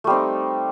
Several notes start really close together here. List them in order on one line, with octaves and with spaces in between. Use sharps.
A3 G3 C4 D#4